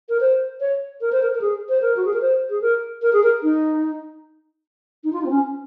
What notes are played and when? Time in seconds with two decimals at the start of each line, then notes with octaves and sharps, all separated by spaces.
0.09 A#4
0.20 C5
0.61 C#5
1.01 A#4
1.12 C5
1.23 A#4
1.35 A#4
1.41 G#4
1.69 C5
1.82 A#4
1.96 F#4
2.05 G#4
2.13 A#4
2.21 C5
2.50 G#4
2.61 A#4
3.02 A#4
3.13 G#4
3.23 A#4
3.43 D#4
5.04 D#4
5.13 F4
5.21 D#4
5.26 C4
5.30 C#4